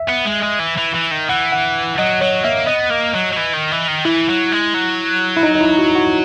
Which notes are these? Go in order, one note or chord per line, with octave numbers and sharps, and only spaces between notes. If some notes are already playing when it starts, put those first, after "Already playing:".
Already playing: E5
B3
G#3
G#3
E3
E3
E3
D#3
E3 F#5
F#5
F#3 D#5
F#3 C#5
A#3 E5
B3 D#5
A#3
F#3
F#3
E3
D#3
E3
D#3
E3 E4
F#3
G#3
F#3
E4
D#4
D#4
E4
F#4
F#4